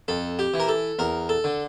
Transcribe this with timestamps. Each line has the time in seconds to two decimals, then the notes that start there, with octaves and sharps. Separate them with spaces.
0.08 F2 A4
0.39 G4
0.54 E3
0.60 A#4
0.68 A4
0.99 E2 A#4
1.29 A4
1.44 D3